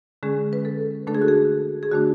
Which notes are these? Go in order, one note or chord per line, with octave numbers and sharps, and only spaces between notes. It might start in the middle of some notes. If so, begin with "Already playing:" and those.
D3 G#3 C#4 G#4
B4
A4
D3 A3 D4 A4
G#4
F#4
G#4
G#4
D3 A3 D4 F#4